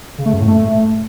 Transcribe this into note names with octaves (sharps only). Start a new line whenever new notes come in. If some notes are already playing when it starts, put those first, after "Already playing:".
C#3
A3
F#2
A2
A3